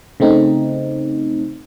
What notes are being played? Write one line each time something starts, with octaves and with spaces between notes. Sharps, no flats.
C#3 A3 C4 D#4